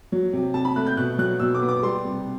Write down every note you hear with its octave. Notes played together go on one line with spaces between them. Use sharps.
F#3
C3
C3 A5
B5
A3 F#6
G6
B2 F#6
F#3 F#6
B2 E6
D6
B3
D6
G3 C6
C3